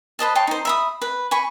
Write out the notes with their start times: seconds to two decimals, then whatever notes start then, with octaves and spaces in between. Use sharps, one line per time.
0.19 B4 C5 D#5 A5
0.35 C#5 G5 A5 C6
0.47 D#4 C5
0.65 E5 B5 D#6
1.01 B4
1.31 G#5 B5 C#6